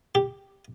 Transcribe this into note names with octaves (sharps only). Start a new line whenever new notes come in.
G4